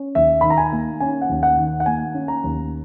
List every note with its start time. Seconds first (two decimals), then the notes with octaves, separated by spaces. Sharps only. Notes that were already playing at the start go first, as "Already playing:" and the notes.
Already playing: C#4
0.15 D#2 E5
0.41 D#3 B5
0.50 A#5
0.58 G#5
0.72 A#3
1.00 C#4 G#5
1.22 F#5
1.29 D#2
1.43 F#5
1.57 D#3
1.80 F#5
1.86 A#3 G#5
2.14 C#4
2.28 A#5
2.44 D#2